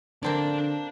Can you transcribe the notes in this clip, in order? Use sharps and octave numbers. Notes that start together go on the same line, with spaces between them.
D3 A#3 C4 D4 D5 A5